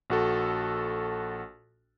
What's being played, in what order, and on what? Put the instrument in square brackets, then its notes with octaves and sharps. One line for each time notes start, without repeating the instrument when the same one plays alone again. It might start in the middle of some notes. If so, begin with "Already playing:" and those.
[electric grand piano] A#1 F#4 A4